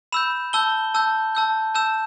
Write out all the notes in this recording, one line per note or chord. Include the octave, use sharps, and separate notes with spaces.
B5 E6 G6 E7
A5 E6 G6 G7
A5 E6 G6
A5 E6 G6
A5 E6 G6 E7